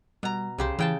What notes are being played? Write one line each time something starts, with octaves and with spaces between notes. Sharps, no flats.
B2 G3 A#5
C2 C#3 G4 C5
C#3 E3 G5 A5